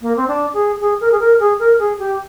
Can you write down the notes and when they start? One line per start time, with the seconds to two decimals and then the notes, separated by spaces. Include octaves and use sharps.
0.02 A#3
0.16 C4
0.28 D4
0.54 G#4
0.80 G#4
1.01 A#4
1.12 G#4
1.20 A#4
1.40 G#4
1.59 A#4
1.79 G#4
1.99 G4